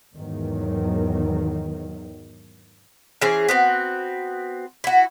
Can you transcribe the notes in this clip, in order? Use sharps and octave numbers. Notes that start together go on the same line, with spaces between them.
E2 G#2 D#3 F#3
E3 C#4 G#4 C5
B3 C4 F#4
E4 F#4